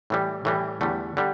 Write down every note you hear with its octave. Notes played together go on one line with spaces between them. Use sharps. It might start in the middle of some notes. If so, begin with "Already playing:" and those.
A2 E3 G3
A2 E3 G3
E2 D3 G3 A3
D3 G3